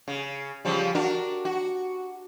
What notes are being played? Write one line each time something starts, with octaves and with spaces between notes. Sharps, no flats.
C#3
C#3 F3 G3
D4 F#4 A#4
F#4